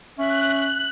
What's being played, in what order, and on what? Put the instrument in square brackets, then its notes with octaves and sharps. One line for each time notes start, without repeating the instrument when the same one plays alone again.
[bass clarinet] C#4 [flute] E5 [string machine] F#6